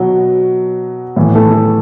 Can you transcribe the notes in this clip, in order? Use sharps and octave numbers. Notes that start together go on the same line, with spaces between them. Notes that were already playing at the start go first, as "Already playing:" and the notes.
Already playing: B2 F#3 F#4
A2 E3
A3 A4